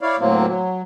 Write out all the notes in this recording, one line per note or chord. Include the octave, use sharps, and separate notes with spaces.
E4 C#5 D5 F5
D2 A2 F#3 A#3 C4
F#3